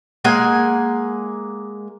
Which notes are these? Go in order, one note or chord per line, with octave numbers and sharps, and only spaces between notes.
G#3 A#3 F#5 G#5